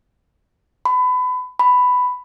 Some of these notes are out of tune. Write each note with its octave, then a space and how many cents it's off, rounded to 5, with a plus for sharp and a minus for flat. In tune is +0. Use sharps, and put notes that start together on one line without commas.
B5 +25
B5 +10